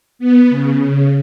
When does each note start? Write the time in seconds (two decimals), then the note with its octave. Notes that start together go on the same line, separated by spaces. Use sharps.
0.19 B3
0.50 C#3